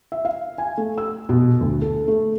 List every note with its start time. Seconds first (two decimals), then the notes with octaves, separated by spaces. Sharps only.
0.12 E5
0.25 F5
0.58 G#5
0.78 A3
0.98 E6
1.29 B2
1.61 D2
1.81 A4
2.08 A3